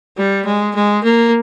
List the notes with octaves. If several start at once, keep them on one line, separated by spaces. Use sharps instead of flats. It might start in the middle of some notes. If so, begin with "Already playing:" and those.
G3
G#3
G#3
A#3